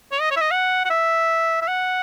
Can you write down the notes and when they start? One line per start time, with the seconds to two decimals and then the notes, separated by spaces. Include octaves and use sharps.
0.12 C#5
0.21 D#5
0.31 C#5
0.37 E5
0.41 D#5
0.51 F#5
0.85 F#5
0.90 E5
1.62 E5
1.68 F#5